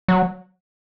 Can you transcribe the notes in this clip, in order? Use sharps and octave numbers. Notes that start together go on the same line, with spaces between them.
F#3